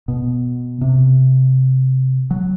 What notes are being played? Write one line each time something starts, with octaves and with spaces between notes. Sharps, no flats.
B2
C3
F#3